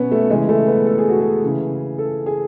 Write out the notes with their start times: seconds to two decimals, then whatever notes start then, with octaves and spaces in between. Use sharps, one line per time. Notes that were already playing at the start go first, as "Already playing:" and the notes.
Already playing: B2 F#3 B3 C#4
0.11 A3
0.30 C#3 E3 G#3
0.49 A3
0.67 B3
0.87 A4
0.98 G#4
1.09 F#4
1.20 G#4
1.42 C#3 E3
1.98 A4
2.26 G#4